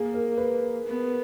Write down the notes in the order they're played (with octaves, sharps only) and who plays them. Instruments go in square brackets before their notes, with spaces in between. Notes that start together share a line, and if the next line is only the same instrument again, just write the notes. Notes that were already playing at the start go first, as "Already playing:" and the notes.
Already playing: [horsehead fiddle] A#3 [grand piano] G#4
[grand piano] A#4
B4
[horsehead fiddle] B3